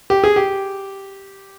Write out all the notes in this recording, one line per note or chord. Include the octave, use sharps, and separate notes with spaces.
G4
G#4
G4